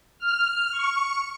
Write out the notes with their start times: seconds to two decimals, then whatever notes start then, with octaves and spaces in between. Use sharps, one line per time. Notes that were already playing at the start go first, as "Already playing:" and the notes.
0.19 F6
0.71 C#6